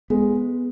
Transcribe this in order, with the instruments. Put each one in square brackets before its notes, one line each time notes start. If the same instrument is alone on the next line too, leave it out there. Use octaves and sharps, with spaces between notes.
[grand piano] G#3 [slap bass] B3